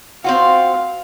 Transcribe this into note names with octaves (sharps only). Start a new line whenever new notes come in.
C4 F4 F#4 F5